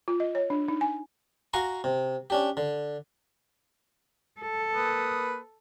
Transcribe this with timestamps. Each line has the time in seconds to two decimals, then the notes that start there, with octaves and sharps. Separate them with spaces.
0.08 F4
0.20 D#5
0.35 C#5
0.50 D4
0.68 D#4
0.81 G#5
1.54 F#4 F5 G#5 A#5 C6 C#6
1.84 C3
2.30 C#4 D4 G4
2.57 D3
4.41 A4
4.74 A#3 B4 D#6